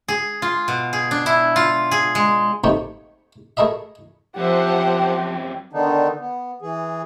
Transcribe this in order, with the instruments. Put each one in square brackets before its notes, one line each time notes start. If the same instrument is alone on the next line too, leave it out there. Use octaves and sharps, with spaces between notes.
[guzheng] G#4
F4
B2
G#4
D4
E4
F4
G#4
G#3
[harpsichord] A3 A#3 C4 D#4 G4 C#5
A3 G#4 A#4 D#5 E5
[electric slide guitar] F#2 C4 E5 [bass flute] F3 [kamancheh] G4 [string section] C5 F#5
[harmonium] D3 D#3 B3 D4 D#4
B3
E3 G#4